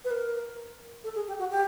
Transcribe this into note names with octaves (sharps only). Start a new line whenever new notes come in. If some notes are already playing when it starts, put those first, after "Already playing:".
B4
A#4
A4
G#4
G4
F#4
G4